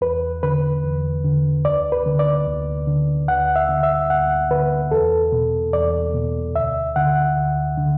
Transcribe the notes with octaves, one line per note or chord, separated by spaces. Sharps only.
E2 B4
D3 B4
E2
D3
D2 D5
B4
D3
D5
D2
D3
D2 F#5
E5
D3
E5
D2 F#5
D3 B4
E2 A4
B2
E2 D5
B2
D2 E5
D3 F#5
D2
D3